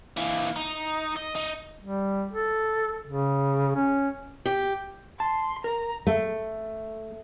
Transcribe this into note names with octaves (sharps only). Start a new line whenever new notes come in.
E3 A#3
D#4
D#5
D#4
G3
A4
C#3
C#4
G4
A5 C6
A#4 A#5
A3